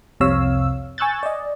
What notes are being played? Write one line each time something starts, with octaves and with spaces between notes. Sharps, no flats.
C2 F2 C3 C#5 F5 E6
G#5 C#6 E6 F#6 G6 A6
D5 D#5